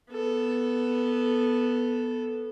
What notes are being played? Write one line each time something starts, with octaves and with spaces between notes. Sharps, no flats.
B3 A4